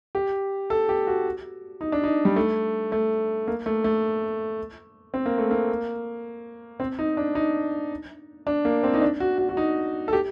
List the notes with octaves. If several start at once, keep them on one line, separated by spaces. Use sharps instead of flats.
G4
A4
G4
F#4
D#4
D4
D#4
G3
A3
A3
A#3
A3
A3
C4
A#3
A3
A#3
C4
D#4
D4
D#4
D4
A#3
C4
D#4
D4
F#4
F#4
F#4
D#4
A4
G4